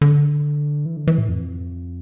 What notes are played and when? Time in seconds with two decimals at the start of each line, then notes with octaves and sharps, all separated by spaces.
0.01 D3
0.86 E3
0.97 D3
1.07 E3
1.18 A2
1.29 F2